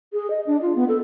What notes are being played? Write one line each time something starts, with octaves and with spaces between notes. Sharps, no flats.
G#4
D#5
D4
F4
B3
A4